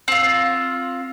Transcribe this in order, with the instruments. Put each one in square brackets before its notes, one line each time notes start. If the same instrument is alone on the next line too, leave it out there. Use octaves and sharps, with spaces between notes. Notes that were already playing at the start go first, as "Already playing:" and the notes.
[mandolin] C4 F4